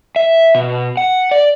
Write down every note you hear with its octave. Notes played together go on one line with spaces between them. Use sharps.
E5
B2
F#5
D5